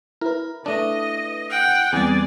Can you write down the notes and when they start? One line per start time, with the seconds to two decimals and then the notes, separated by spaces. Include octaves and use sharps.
0.21 E4 A#4 B4
0.66 A3 D4 D#5
1.50 F#5 G5
1.93 E2 G3 C4 G#4 D5 G#5